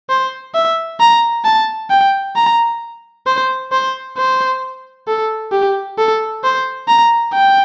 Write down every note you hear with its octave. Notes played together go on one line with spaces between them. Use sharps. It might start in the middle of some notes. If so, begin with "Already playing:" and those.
C5
E5
A#5
A5
G5
A#5
C5
C5
C5
A4
G4
A4
C5
A#5
G5